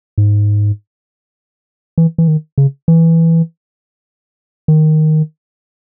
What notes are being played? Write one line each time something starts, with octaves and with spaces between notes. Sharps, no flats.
G#2
E3
E3
D#3
C#3
E3
D#3